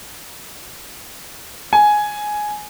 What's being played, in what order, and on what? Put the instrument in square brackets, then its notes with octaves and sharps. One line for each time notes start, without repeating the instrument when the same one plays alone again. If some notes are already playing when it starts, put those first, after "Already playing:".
[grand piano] G#5